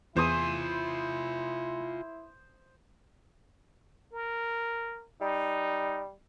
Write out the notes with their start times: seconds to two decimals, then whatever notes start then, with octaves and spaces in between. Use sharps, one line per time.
0.17 E2 E4 F4 C5 G#5 D#6
4.13 A#4
5.21 G3 D#4